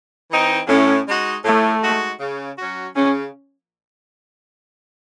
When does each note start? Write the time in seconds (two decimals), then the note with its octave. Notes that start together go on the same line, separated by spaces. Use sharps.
0.30 E3 C4 D#4
0.68 A2 C#4
1.06 G#3 D#4 F#4
1.44 A2 A3
1.82 G#3 D#4 F#4
2.20 C#3
2.58 F#3 C#4 F#4
2.96 C#3 C#4